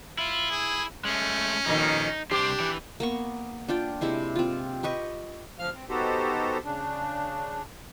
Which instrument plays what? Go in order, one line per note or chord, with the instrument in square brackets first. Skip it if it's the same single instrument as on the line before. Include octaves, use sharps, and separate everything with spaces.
[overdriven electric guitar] E4 [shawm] F4
[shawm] G#4
[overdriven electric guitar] G#3 A3 [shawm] C#4
[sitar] F2 A#2 D#3 [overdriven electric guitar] D#4
[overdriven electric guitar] C2 C5 [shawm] D4 [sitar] G4
[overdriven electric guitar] E3
[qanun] A#3 B3 C#6
D4 F4 G5
C3 G#3 E4 C5
C4 F4
G4 B4 D#5 C#6
[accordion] D2 F3 F5 F6
C4
B3 D#4 F#4 G4 A4 C5
C#3 D4